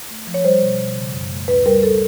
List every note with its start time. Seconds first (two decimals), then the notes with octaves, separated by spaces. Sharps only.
0.10 A3
0.27 F3
0.34 C#5
0.44 G3 C5
0.62 B2
0.79 B2
0.96 C#3
1.13 F#2
1.32 A3
1.48 D2 B4
1.66 G3 A#4
1.83 G3 A4